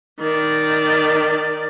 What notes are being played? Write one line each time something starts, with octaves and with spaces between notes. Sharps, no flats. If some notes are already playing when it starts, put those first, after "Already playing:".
D#3 D5